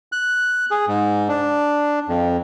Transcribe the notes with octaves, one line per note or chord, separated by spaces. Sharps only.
F#6
G#4
G#2
D4
F2